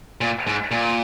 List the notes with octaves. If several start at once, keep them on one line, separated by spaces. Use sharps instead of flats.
A#2
G#2
A#2